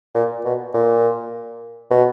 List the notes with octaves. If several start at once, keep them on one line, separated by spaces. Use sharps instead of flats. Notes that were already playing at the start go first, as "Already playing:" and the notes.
A#2
B2
A#2
B2